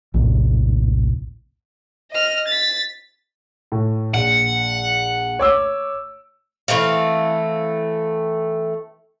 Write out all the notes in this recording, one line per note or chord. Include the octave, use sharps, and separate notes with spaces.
A#1 D#2 A2 C3
D#5 F6
A6 B6
A2
A#1 F#5
C#5 D6 E6
E3 A3 C4 F5